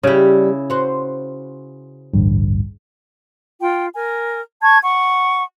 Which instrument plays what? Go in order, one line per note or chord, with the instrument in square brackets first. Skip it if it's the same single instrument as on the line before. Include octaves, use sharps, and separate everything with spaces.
[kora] C#3 E4 [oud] G3 G4
[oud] F#4 C5
[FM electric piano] A1 D2 G2
[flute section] F4 G5
A#4 G#5
A5 C#6 G#6
F#5 C#6